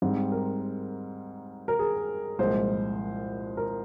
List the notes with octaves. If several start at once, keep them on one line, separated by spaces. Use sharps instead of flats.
G#2 G3 C4
A#4
A#4
G#4
C2 A#2 F3 G#3 C5
A#4